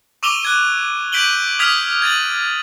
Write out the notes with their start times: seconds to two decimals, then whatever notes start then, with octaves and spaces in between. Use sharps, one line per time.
0.23 C#6 D6 E6 D#7 F7 G7
0.43 F#6 G#6 D#7
1.12 G6 B6 D7 D#7 F#7 G7
1.59 D#6 F6 G#6 B6 F7
2.02 G#6 A6 D#7 F#7